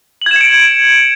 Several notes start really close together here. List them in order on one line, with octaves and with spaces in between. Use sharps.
F#7 G#6 E7 C#7 D7